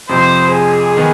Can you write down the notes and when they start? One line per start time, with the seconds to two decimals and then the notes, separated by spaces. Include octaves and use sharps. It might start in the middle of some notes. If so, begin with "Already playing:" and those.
0.09 F2 C3 F3 C5
0.52 G#4
0.97 D#3 B3